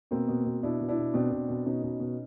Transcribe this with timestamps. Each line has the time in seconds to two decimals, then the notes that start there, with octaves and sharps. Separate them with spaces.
0.11 B2 A#3 C4
0.28 B2
0.46 B2
0.63 B2 D4 E4
0.80 B2
0.89 D4 E4
0.97 B2
1.14 B2 C4 D4
1.31 B2
1.49 B2
1.66 B2 C#4 D#4
1.83 B2
2.00 B2